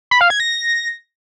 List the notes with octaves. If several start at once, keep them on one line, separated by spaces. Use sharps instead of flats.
B5
F5
G#6
A#6